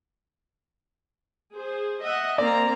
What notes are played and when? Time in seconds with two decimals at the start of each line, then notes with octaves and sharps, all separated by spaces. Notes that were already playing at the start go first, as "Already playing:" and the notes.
1.55 G#4 C5
2.03 D#5 E5 F#5
2.38 A#3 C4 D5 A#5